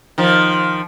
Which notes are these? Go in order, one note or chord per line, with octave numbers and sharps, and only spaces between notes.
D#3 F3